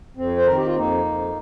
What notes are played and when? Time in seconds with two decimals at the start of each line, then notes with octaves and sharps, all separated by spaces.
0.17 F2 C4
0.37 C5
0.46 D#3 A#4
0.57 G4
0.66 F4
0.76 F2 A#3 D#4
1.05 F2